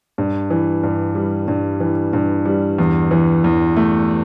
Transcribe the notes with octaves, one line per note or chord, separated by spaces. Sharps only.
G2
E3
G2
G3
G2
E3
G2
G3
E2
E3
E2
A3